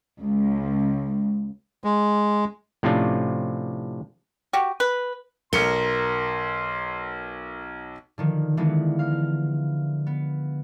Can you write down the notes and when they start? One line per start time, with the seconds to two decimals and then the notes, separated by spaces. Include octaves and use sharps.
0.21 C#2
1.84 G#3
2.83 A2 C3 F3 C#4 D4 F4
4.53 F#4 G4
4.80 B4
5.53 B1 A#4 C6 C#7 G7
8.18 D3 D#3 F3
8.57 D3 E3 F3 G#3 B3
8.99 F5
10.07 B3